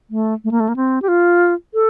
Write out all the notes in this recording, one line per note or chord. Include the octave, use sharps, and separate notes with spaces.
A3
A3
A#3
A3
A#3
C4
G4
F4
A4